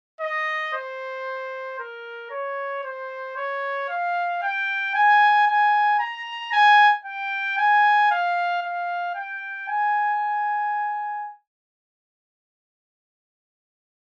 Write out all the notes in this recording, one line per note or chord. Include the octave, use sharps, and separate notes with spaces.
D#5
C5
A#4
C#5
C5
C#5
F5
G5
G#5
G#5
A#5
G#5
G5
G#5
F5
F5
G5
G#5